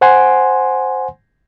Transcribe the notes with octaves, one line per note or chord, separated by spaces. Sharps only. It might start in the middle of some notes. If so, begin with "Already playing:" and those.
C5 F#5 G#5 C6